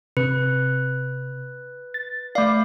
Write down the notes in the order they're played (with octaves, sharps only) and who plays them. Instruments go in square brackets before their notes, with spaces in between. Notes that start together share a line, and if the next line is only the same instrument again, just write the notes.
[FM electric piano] C3 [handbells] B4
[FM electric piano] A6
[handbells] A3 F5 [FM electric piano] D5